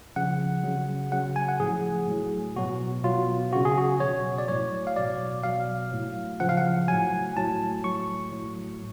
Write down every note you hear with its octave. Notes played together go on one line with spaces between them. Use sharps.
C#3 F3 F#5
C#3 F#3
C#3 F#3 F#5
G#5
F#5
A2 F3 G#4
A2 F#3
B2 F#3 F#4
B2 F#3 F4
C#3 F#3 F#4
G#4
F#4
B2 F#3 C#5
D5
A2 F#3 C#5
F5
B2 F#3 D5
B2 F#3 F5
A2 F#3
C#3 F3 F#5
F5
F#5
A2 F#3 G#5
A2 F#3 A5
A2 F#3 C#6
A2 F#3